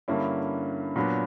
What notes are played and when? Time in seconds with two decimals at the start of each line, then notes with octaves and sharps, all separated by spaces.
0.08 G2 D3 A#3 C#4 E4
0.96 A#2 F#3 B3 D4